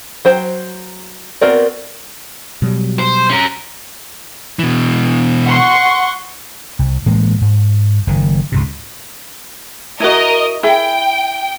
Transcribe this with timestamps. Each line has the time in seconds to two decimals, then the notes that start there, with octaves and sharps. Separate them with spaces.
0.25 F#3 C5 G5
1.41 B3 C4 F#4 A#4 D5
2.62 B2 F#3 G3
2.99 C5
3.30 C#4 A#4
4.59 B2 E3
5.45 F#5 C6 C#6
6.79 C2
7.06 A2 E3 G#3 A#3
7.41 G#2
8.07 F#1 D#3
8.52 C#2 G#2 C3
10.00 E4 F#4 A#4 D#5
10.63 E4 G#4 G5